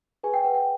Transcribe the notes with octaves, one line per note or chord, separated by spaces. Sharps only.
G#4 B4 G#5
G5
B4 F#5
G5